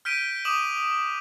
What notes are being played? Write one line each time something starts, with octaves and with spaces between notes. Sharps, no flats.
F6 G6 B6 D7 D#7
D6 D#6 E7 F#7